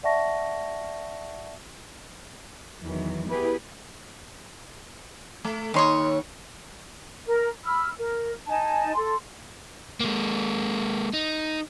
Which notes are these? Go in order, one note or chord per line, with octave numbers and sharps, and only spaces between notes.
D5 E5 F#5 A5 C#6 A#6
E2 D#3 E3 F#3
B3 E4 G4 G#4 B4
A3
D#2 C#5 D#5 C6 D#6
A#4
B5 E6 F6
A#4
D#4 G#5 A5
A4 C6
G#3 A#3
D#4